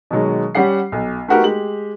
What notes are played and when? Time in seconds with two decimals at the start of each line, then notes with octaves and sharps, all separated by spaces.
0.11 B2 D#3 F#3 G#3
0.55 G3 C#4 G4 F#5 C7
0.92 B1
1.28 A3 B3 D#4 F#4 G4 A#4
1.44 G#3 G4 F#7